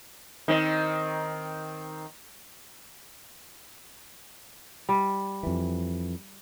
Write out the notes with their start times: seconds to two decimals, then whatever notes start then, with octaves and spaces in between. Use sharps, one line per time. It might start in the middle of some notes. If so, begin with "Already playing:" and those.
0.48 D#3 C4
4.89 G3
5.43 F2 E3